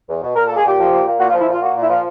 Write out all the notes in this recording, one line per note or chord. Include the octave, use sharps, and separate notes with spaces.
E2
B2
A#2 A#4
A4
A#3
G#4
A#2 G4
F3
A#2
A#3
A#2 F#4
F4
F3
E4
A#2 F4
A#3 F#4
A#2 E4
F3 F4